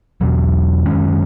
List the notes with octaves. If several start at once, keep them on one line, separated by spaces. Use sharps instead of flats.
E2 B2 F#3
F#2 D#3 G#3 C#4